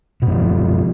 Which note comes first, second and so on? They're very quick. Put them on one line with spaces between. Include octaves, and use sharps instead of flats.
B2 F#2 F3